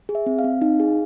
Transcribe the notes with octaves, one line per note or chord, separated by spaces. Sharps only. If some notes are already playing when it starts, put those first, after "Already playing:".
G#4
E5
C4
F5
C4
D#4
G#4